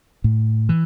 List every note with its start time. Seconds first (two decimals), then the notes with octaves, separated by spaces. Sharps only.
0.24 A2
0.69 E3